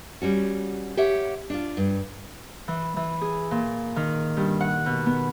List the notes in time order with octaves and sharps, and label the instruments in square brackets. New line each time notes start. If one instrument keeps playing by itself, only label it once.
[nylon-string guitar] G3 C#4 F#4
G4 C#5 E5 F#5
D4 F4
G2
[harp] E3
E3
G#4
A#2
D#3
G2
F#5
B2
B3